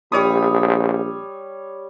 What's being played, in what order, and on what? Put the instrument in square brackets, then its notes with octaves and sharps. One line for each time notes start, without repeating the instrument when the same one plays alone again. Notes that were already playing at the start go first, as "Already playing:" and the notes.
[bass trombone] A#1 [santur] G3 C#5 D#6